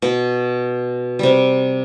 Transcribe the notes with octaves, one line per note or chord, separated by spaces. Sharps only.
B2
C3 G3